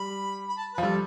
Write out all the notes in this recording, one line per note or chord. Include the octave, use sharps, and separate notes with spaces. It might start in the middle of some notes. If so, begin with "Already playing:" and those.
Already playing: G3 B5
B5
A5
B4
F3
G3 A4